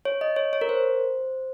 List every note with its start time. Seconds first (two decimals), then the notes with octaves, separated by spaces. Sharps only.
0.05 C#5
0.21 D#5
0.36 C#5
0.53 C#5
0.61 A#4
0.69 C5